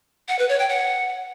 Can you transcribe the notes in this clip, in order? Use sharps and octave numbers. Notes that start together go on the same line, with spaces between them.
F#5
B4
C#5
G5
F#5